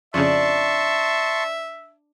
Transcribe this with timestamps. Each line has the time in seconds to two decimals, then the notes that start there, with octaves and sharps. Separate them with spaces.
0.14 F2 C#3 D4 E5 A5 C6 C#6